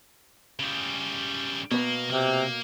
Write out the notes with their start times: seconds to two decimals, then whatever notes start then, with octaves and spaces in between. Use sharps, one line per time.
0.59 C#3 G3
1.71 B2 A#3 B3
2.10 C3 A#3